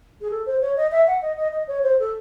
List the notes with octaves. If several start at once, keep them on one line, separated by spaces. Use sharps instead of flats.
G#4
A4
C5
C#5
D#5
E5
F#5
D#5
D#5
D#5
C#5
C5
A4